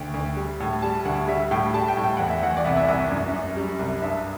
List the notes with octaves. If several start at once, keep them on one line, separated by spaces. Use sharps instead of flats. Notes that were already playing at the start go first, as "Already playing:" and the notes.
Already playing: D2 G5
D2
G3
A2
G3 A5
D2 F#5
G3 E5
A2 G5
G3 A5
G5
A2
G5
E2 F#5
E5
E2 F#5
D5
C2 E5
E5
C2 E5
F#2
F#2
G3
C2
G2 E5